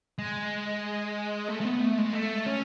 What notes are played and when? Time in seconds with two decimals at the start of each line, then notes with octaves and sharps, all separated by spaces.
0.19 G#3
1.48 A3
1.61 A3
1.65 B3
1.81 A3
1.98 G#3
2.13 A3
2.46 C#4